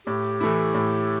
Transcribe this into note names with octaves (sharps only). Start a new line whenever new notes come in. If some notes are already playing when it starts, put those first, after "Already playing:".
A2 G4
E3 A3 E4
A2